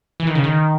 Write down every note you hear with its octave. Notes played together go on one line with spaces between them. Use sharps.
E3
D#3
C#3
D#3